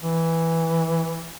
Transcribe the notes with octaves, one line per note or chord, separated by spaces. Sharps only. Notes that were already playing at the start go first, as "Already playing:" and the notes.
E3